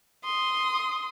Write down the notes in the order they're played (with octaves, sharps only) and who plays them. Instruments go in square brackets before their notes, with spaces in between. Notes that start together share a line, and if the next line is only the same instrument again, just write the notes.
[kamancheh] C6 D#6